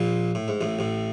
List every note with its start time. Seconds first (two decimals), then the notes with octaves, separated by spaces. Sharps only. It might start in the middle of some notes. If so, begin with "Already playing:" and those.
Already playing: A#1 A#2
0.35 A2
0.48 G#2
0.61 A1 A2
0.79 A1 A2